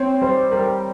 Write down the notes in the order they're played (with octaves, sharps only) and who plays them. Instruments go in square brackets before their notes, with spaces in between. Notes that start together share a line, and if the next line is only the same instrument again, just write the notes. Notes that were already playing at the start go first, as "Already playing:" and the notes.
Already playing: [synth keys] C4 [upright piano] C#5
[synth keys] G3 [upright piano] C5
[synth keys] G3 [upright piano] A#4